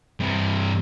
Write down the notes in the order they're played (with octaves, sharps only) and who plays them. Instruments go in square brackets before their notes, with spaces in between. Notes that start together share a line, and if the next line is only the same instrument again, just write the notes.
[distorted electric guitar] G2 C3